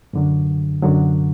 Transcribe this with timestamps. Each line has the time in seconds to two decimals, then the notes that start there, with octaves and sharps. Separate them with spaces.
0.13 F#2 D3 F#3
0.82 F#2 D3 F#3